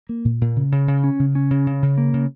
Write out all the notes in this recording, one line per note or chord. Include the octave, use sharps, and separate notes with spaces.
A#3
A#2
A#2
C#3
C#3
C#3
C#4
C#3
C#4
C#3
C#3
C#3
A#3
C#3